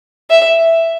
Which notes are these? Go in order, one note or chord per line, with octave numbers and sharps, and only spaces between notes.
E5